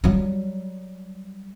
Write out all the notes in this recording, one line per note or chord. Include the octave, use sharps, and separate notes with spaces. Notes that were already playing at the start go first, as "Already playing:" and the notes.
F#3 G3